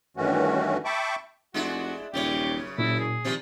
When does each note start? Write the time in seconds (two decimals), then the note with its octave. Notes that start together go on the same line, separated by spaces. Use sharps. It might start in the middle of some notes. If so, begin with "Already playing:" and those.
0.17 G2 D#3 E3 A3 C#4 F#4
0.85 E5 G5 A5 B5 C#6 D6
1.54 F1 G#3 D4 E4 F#4
2.14 D#1 F#2 C#3 G4 C#5
2.78 F#1 A#2 E4
3.00 G#4
3.24 C3 D#3 F3 G3